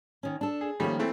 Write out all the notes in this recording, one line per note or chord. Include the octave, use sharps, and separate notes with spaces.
D#3 C#4
D4 A4
G#4
D#3 F3 G3 A3 A#3 C#4
E3 A3 C4